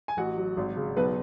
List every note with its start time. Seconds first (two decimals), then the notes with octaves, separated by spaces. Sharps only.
0.08 G#5
0.17 A1 F#4 F#5
0.37 F#3
0.57 G#1
0.77 C#3
0.97 B1 B3 B4